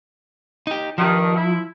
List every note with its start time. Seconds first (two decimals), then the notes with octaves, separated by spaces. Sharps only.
0.67 D#4 G4
0.98 G2 D#3 F3
1.35 E4